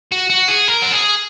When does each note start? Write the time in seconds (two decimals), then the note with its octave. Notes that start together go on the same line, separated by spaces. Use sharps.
0.12 F#4
0.30 F#4
0.48 G#4
0.68 A#4
0.82 F#4
0.92 G#4